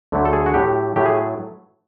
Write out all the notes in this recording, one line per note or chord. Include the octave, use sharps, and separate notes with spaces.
D2 D3 F#3 A3
A4
G#4
F#4
A2 F#3 A3 G4
A2 F#3 A3 G4
G#4